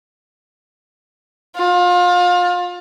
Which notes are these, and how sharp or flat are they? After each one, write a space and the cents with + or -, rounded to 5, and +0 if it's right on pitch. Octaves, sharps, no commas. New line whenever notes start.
F4 +30